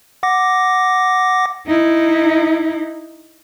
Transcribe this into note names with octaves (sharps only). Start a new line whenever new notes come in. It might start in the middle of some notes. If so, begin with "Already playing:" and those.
F#5 D6 A#6
D#4 E4